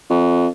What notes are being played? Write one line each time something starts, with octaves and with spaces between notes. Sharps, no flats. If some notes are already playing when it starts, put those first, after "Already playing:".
F2